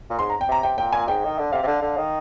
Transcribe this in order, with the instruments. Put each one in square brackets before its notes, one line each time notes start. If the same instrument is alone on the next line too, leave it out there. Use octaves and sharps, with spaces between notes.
[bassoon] A#2
[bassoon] G#2 [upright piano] C6
[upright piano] A#5
G5
[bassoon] C3 [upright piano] A#5
[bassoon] C3 [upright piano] G5
[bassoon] A#2 [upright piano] G5
[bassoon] A#2 [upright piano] G#5
[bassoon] G#2 [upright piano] G5
[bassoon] D#3
D3
[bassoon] C3 [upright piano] F5
[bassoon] C3
D3
D3
D#3